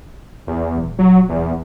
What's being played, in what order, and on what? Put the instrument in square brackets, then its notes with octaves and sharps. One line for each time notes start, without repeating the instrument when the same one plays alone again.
[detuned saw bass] E2
[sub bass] D#1
[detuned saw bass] F#3
E2